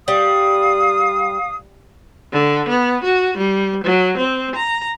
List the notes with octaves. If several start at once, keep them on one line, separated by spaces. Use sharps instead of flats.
G3 F5 D#6
D3
B3
F#4
G3
F#3
C4
A#5